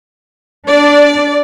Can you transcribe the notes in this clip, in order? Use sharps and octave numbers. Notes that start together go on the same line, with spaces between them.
D4 D5